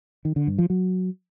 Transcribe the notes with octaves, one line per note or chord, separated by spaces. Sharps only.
D#3
D3
G2
F3
F#3